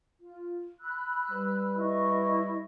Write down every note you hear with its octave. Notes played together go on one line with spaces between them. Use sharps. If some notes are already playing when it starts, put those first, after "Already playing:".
F4
B5 E6 F#6
G3 B4
E4 D#5 C#6